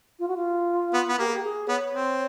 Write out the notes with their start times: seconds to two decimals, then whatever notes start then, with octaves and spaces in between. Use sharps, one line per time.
0.19 F4
0.28 F#4
0.36 F4
0.94 B3
1.09 B3
1.19 A#3 G4
1.27 G#4
1.34 G4
1.44 G#4
1.68 B3 C#5
1.93 C4